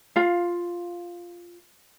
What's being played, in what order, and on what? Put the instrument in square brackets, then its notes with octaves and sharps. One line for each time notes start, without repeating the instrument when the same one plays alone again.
[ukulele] F4 F5